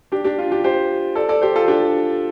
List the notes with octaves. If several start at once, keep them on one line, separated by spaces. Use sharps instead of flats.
D4 G4
D4 G4
F4
D4 G4
G4 C5
A4 D5
A4 D5
G4 C5
F4 A4
D4 G4